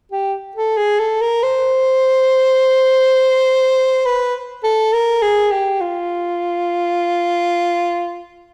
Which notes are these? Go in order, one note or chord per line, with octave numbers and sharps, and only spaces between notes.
G4
A4
G#4
A4
A#4
C5
B4
A4
A#4
G#4
G4
F4